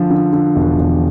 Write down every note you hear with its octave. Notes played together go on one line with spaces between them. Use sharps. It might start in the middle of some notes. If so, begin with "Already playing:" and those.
Already playing: D3 F3
D3
D3
E1
E1